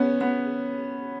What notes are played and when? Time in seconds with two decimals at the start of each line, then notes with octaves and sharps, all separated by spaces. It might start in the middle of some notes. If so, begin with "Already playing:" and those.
Already playing: B3 C#4
0.21 B3